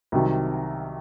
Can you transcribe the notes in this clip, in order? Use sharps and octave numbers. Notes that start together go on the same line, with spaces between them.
C2 C3 D#3 F#3